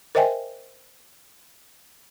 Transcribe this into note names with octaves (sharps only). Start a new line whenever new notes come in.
A#4 C5 D#5 E5 G5 G#5